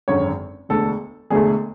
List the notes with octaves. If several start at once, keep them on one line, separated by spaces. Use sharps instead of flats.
G#1 F#2 D3 C#5
E1 D2 D3 A4
E1 D2 D3 A3 G#4